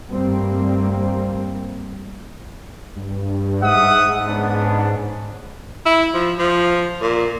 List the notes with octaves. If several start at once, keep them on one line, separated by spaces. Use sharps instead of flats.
G2 G3 A3 A#3 C4
G2
G#2 E5 F#5 D#6
B3 C#4 D4
E4
F3
F3
A#2